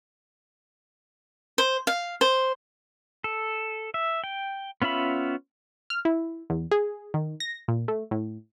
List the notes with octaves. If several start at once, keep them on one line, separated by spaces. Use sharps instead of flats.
C5
F5
C5
A4
E5
G5
B3 C#4 F4 E5 B5
F6
E4
E2
G#4
D#3
A#6
A#2
A3
A2